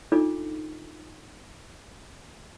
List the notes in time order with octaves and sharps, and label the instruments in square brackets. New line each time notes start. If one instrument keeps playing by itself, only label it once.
[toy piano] D4 D#4 F4 A4 D6